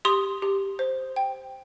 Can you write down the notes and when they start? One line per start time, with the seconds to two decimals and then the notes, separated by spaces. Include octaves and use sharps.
0.05 G4 C6 D#6
0.42 G4
0.79 C5
1.16 G5